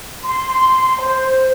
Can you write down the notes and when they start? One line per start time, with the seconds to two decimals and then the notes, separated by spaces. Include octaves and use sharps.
0.25 C6
1.01 C5